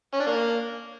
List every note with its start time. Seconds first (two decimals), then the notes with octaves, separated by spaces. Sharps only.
0.14 C#4
0.20 D4
0.26 A#3